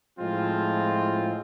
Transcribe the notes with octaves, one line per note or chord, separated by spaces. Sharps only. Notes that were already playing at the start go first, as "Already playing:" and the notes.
A2 F3 G#3 C4 F4